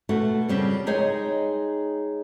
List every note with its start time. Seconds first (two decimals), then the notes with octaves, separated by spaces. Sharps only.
0.09 B2 A3 F#4
0.48 F2 C#3 G3 C4
0.86 G#3 D#4 G#4 C#5 D#5 G5